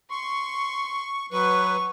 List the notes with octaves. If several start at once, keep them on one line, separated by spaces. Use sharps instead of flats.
C6 C#6
F#3 B4 C#6